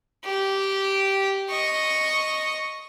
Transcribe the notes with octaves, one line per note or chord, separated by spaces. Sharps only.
G4
D#5 C#6